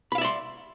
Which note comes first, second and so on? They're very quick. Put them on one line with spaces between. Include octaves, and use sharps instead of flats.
B5 F5 E5 D5 C6